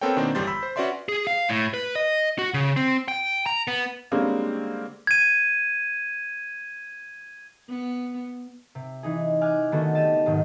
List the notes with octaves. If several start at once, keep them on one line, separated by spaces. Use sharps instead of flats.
B3 C4 A4 A#4 C#5 G5
B2 D#3 A#3 C4 D4
G1 E2 G3 C6 G6 A6
B5 E6 B6
C5
C#4 F#4 B4 D5 E5 C6
G#4
F5
A2
B4
D#5
F#4
C#3
C4
G5
A#5
B3
D3 G3 G#3 A#3 C4 C#4
G#6 D#7
B3
C3
E3 D#4 G#4
G#5 D6 F6 F#6
D3 D#3 A3 B3 F#4 A4
G4 A5 D#7 E7
B1 G#2 D#3